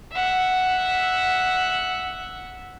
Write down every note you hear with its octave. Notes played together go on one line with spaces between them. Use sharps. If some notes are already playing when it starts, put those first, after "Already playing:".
E5 F#5